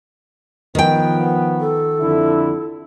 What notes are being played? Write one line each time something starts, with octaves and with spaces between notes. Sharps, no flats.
D#3 F3 B3 G5
A4
F2 D3 E4